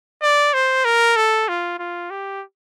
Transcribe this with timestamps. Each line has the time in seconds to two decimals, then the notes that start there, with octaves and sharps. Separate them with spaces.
0.22 D5
0.54 C5
0.85 A#4
1.16 A4
1.48 F4
1.79 F4
2.10 G4